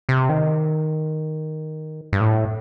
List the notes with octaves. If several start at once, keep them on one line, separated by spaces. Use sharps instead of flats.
C3
D#3
G2
A2